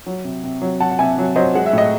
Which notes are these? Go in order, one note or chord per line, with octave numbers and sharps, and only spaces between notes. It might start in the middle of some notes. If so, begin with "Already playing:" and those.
F#3
C3
C3
F#3
F#3 F#5 A5
F#5
C3 E5 G#5
F#3
F#3 C5 D#5
G#3 F#5
E5
A2 D#5